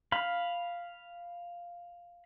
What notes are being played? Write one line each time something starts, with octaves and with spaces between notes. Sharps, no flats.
F5 B5